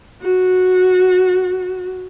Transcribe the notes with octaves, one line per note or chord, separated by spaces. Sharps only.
F#4